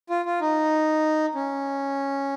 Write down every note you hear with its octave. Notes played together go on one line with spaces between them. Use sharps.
F4
F4
D#4
C#4